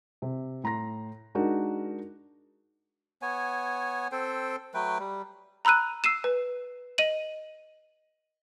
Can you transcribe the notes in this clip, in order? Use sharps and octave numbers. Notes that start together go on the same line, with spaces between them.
C3
A2 A#5 C6 A#6
G#3 D4 D#4 F#4 A#4
B3 C#5 G#5
C4 A4 C5 G5
F#3 A3 B4 G5
G3
A#5 B5 E6 F#6 D#7
E6 C7 D#7 E7
B4
D#5 D#7 F#7